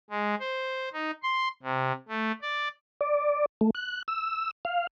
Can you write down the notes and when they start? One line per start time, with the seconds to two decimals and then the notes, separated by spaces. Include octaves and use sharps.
0.10 G#3
0.40 C5
0.93 D#4
1.23 C6
1.63 C3
2.08 A3
2.41 D5
3.01 D5
3.61 A3
3.75 F#6
4.08 E6
4.65 F5